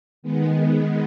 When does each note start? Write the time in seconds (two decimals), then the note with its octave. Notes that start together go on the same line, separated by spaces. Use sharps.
0.22 D#3 G#3 B3